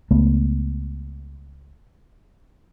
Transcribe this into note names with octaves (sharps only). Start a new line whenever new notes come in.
C#2 A3 B3